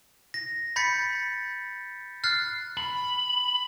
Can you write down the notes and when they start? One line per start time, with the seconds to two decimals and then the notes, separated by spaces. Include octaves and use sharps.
0.34 A#6
0.76 B5 G6 A6 B6 C#7
2.24 F6 F#6 A6 C7
2.77 B5